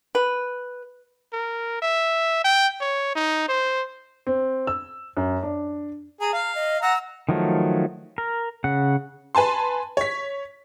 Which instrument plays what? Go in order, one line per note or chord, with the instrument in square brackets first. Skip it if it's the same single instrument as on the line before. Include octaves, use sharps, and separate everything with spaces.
[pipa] B4
[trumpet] A#4
E5
G5
C#5
D#4
C5
[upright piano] C4
E6
F#2
D4
[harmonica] G#4 [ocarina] A#5
[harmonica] F5
[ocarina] D#5
[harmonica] F#5 A#5 [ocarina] E6
[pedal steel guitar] D#3 F3 F#3 A3
A#4
C#3 F#5
[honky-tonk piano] B4 G#5 A5 C6
C#5 B6